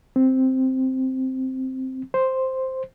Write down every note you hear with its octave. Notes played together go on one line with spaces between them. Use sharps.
C4
C5